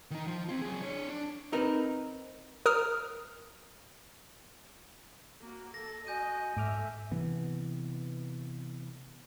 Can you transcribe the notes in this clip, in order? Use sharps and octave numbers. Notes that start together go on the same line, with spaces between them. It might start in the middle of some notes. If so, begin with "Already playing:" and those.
D#3 D#4
F3
C4 F4
F#3 G#4
D4 C#5
D4
C4 D#4 A#4 B4
A#4 D#6 F6
A#3 F#4
A4 A#6
F#4 D#5 G#5 G6 D#7
G#2 A3 E5 D6 F6
C3 E3 B3